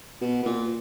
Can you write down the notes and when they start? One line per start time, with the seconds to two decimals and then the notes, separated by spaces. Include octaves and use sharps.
0.21 B2
0.43 B2
0.46 A#2